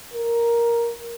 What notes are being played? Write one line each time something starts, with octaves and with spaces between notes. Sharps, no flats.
A#4